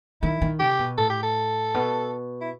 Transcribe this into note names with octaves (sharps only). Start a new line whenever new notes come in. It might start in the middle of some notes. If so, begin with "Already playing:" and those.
D#3 E4
D#3
C3 G4
B2
A2 A4
G4
A4
B2
E4